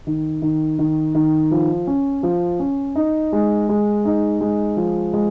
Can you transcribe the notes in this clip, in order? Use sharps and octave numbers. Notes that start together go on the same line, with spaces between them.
D#3
D#3
D#3
D#3
F3
C#4
F3
C#4
D#4
G#3
G#3
D#4
G#3
F3
G#3